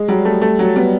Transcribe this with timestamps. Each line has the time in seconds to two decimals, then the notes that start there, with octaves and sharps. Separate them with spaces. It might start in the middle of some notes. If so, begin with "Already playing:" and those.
Already playing: G#3
0.08 F#3 G3
0.25 A3
0.42 A3
0.59 F#3
0.75 G3 B3